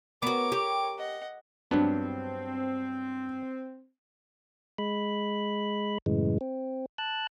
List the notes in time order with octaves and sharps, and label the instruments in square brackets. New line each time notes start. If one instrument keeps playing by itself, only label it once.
[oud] B3 F#4 [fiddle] A#4 C#5 [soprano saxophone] D6
[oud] G4
[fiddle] D#5 F#5
[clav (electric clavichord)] G2 F#3 B3 [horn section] C4 [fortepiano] D4
[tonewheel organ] G#3 B5
F#2 A2 C#3 E3 G#3
C4
A5 F#6